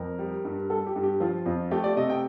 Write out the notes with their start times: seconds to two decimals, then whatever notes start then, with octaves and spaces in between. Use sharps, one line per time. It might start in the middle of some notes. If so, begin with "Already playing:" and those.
Already playing: F2 A#4
0.19 G3
0.45 G2
0.70 G3 A4
0.87 G4
0.96 G2
1.03 G4
1.20 F3 F4
1.45 F2 F4
1.71 A3 G4
1.84 D5
1.97 C3 D#5
2.10 G5